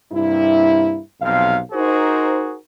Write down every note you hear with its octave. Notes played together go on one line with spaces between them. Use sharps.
G2 C3 A#3 E4
B1 F2 C3 F5
D#4 F#4 G#4 A#4 C5